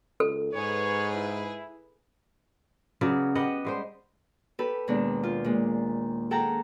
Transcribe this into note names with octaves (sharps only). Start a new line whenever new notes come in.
C#2 A4
G#2 G#4 B4 C#5
E4
C#3 F#3 B3 D5
B3 G4 D#5 F#5
G3 G#3 C5
G4 A4 B4
D#2 B2 G#3 D4
F4
A#2 G#3
G#4 A4 F#5 G5 A5 A#5